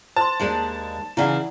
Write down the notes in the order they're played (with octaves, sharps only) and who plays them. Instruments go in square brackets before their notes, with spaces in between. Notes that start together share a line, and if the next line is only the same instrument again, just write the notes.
[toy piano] C5 C6 [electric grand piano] A5
[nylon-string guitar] D#2 G#3 D4
[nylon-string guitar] C#3 E3 [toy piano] E4 D5 F#5